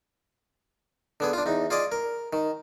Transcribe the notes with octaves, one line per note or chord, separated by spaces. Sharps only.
D3 B3 G#4
D4 F4
E2 D#4
F4 G#4 D5 D#5
A#4
D#3